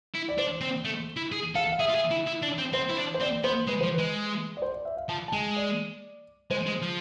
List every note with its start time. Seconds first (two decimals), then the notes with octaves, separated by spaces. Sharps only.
0.14 E4
0.29 D5
0.38 D4 C5
0.61 C4
0.85 A3
1.17 E4
1.32 G#4
1.55 A4 F5
1.72 F5
1.79 G#4 E5
1.89 F4
1.95 G#4
2.11 E4
2.27 E4
2.42 D4
2.58 C4
2.73 C4 C5
2.90 E4
2.97 D4
3.14 C5
3.20 C4 D5
3.44 B3 C5
3.67 G#3 B4
3.81 F3 C5
3.94 G#3 B4
4.57 D5
4.62 C5
4.74 D5
4.85 E5
4.97 F5
5.09 F3 A5
5.28 A5
5.32 G#3 G#5
5.56 D5
6.51 G#3 C5
6.66 G#3
6.82 F3